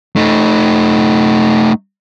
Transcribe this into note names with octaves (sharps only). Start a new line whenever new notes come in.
A3 D#4